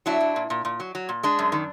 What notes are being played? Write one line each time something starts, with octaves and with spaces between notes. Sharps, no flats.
F#3 D4 E4
F#3
A#2
A#2
A#2
F#3
F#3
A#2
G#3 D4
F#2
D#3